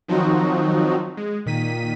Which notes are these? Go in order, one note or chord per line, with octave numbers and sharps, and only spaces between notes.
D#3 F3 F#3 C4 D#4 F#4
G#3
A#2 D#3 B6 D#7